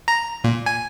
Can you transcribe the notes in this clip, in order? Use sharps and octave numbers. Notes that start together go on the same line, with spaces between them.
A#5
A#2
G#5